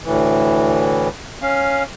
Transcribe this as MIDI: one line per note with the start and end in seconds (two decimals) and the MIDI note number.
0.05 1.08 38
0.05 1.08 45
0.05 1.08 52
1.42 1.83 61
1.42 1.83 77